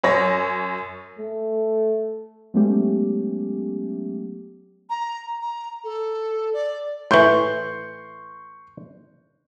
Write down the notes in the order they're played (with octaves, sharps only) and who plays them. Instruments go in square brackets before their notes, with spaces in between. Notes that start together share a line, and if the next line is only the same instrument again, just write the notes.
[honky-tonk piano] F#2 C#5 A#6
[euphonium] A3
[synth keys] F#3 G#3 A3 B3 C#4 G4
[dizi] A#5
A#5
A4
D5
[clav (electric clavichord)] A2 E3 [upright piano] C6 C#6 G6